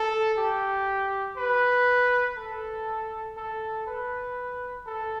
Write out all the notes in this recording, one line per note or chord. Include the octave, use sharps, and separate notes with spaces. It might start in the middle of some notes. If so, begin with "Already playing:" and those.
Already playing: A4
G4
B4
A4
A4
B4
A4